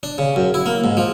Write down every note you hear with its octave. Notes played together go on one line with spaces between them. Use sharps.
D4
C#3
F#2
E4
A#3
G#2
F3